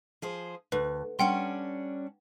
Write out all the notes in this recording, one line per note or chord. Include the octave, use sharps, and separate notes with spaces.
F3 G#4 C5
D2 B4
G3 C#4 D4 F#5 G5 C6